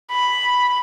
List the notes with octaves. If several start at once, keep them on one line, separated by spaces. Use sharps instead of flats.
B5